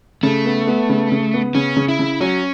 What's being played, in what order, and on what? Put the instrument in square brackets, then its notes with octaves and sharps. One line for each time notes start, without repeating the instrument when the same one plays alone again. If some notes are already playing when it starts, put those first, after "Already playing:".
[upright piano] C#3 [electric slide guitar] A3
[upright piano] B3
B3
C#3
C#3
B3
[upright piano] C#3 [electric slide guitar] C#4
[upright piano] C#3
[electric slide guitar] E4
[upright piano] C#3
[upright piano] F#3 [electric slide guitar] C#4